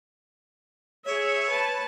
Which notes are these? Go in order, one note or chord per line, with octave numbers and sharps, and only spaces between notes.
G#4 C#5 E5
B4 A5